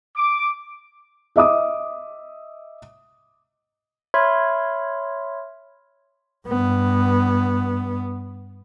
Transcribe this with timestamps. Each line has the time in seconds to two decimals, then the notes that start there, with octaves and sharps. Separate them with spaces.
0.15 D6
1.36 D#5 E5 D6 D#6
4.14 C#5 E5 B5 C6 F6 G#6
6.48 G2 B3